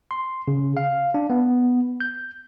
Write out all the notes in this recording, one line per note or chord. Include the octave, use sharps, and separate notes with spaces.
C6
C#3
F5
D4
B3
G6